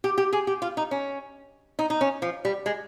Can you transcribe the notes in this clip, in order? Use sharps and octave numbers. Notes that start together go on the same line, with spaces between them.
G4
G4
G#4
G4
F4
D#4
C#4
D#4
D#4
C#4
F3
G3
G#3